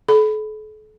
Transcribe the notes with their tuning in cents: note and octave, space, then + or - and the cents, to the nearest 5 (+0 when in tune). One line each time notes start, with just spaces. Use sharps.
A4 -40 B5 +15